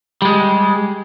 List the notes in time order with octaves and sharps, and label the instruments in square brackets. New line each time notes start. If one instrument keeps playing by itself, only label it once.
[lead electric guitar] G3 G#3